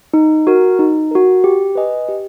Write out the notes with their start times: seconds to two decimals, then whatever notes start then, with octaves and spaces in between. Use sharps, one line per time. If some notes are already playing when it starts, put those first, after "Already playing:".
0.14 D#4
0.47 F#4 A#4
0.79 D#4
1.11 F#4 A#4
1.44 G4
1.75 B4 D#5 G#5
2.08 G4